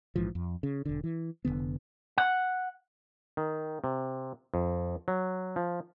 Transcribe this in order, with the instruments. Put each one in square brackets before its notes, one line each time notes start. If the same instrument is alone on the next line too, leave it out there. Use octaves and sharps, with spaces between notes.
[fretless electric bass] A#1 G#2 E3 F3
F2
C#3
E1 D3
E3
F1 F#2 D3 B3
[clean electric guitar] F#5
[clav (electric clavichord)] D#3
C3
F2
F#3
F3